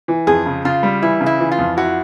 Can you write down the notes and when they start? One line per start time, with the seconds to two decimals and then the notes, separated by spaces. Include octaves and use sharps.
0.08 E3
0.27 F2 G#4
0.46 C#3
0.65 C#3 F4
0.83 G3
1.02 E3 E4
1.21 C#3
1.26 E4
1.40 E3
1.51 F4
1.59 F2
1.77 E4 F#4